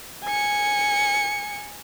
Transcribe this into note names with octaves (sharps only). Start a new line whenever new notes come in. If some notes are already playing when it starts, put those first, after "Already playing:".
G#5 C#7